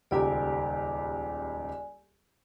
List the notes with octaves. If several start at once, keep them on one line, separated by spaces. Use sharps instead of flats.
D#1 C#2 G4 D5 G#5